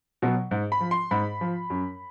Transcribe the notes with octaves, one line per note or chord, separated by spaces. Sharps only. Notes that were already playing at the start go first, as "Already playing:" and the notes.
B2 F#3
G#2
B5
F3
C6
G#2 B5
F3
F#2